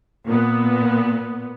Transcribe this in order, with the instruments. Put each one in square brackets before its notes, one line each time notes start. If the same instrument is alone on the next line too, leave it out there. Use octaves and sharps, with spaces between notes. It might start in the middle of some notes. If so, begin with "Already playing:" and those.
[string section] A#2 B3